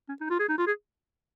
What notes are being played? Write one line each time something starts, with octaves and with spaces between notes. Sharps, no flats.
C#4
D#4
F4
G#4
D#4
F4
G#4